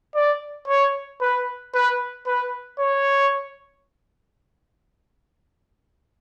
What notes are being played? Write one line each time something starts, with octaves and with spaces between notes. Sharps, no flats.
D5
C#5
B4
B4
B4
C#5